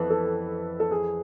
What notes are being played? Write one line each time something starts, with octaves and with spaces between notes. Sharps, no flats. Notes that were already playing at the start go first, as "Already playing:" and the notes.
Already playing: F2 E3 B3 B4
A4
A4
G#4